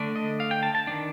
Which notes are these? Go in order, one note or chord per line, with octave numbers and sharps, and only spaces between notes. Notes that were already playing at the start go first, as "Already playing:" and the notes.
Already playing: D3 A3 D4
D#5
F5
G5
A5
A5
D#3 A#3 D4